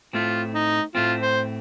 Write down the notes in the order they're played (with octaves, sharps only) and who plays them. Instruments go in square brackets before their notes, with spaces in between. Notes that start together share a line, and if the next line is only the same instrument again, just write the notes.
[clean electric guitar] A2 A3 C4 [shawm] F4
[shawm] D#4
[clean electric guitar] A2 A3 C4 [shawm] F4
[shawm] C5